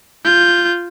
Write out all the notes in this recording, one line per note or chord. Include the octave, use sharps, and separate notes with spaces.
F4 G6